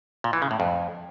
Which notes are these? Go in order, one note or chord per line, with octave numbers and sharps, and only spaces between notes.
A#2
E3
C#3
A2
F2